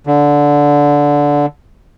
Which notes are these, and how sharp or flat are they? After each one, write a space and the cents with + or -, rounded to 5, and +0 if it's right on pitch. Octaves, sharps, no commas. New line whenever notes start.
D3 -10